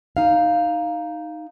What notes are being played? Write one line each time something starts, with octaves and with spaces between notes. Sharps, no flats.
D#4 F5